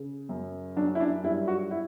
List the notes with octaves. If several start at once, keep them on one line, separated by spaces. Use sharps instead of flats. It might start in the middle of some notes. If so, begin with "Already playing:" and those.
Already playing: C#3
F#2
F#3 D4
E4
D4
G2 E4
F#4
E4